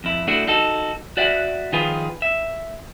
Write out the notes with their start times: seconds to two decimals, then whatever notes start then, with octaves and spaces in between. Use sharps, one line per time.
0.04 F2 E4
0.28 A3 D4 E4 F#4
0.48 D#4 F#4 A4
1.17 F#4 D5 E5 F#5
1.72 D#3 F3 F4 G#4 B4
2.22 E5